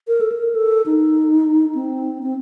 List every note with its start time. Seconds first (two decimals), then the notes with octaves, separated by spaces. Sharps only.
0.08 A#4
0.21 A4
0.32 A#4
0.55 A4
0.86 D#4
1.75 C4
2.23 C4